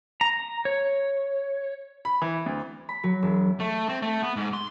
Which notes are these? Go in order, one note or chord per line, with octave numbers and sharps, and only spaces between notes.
A#5
C#5
B5
E3
D2
B5
F#3
E1
A3
C4
A3
B3
G#2
C6